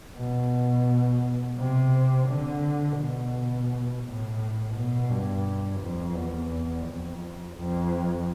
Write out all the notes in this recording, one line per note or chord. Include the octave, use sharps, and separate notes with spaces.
B2
C3
D3
B2
A2
B2
G2
F2
E2
F2
F2